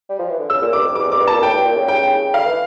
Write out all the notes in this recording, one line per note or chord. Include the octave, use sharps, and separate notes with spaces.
G3
F3
E3
D3
C#3 E6
A#2
G2 D6
F2
E2 D6
F2 D6
G2
A#2 A5
A2 G5
G2
A#2
C#3
G5
D3 F5
E3